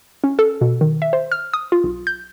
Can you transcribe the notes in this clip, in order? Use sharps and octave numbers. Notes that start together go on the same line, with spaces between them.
C#4
A4
B2
D#3
E5
C5
F6
D#6
F4
B1
G6